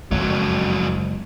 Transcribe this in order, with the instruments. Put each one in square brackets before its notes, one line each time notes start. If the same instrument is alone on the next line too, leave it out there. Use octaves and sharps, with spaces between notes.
[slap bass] F#1 G#3 [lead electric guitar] F2 F#3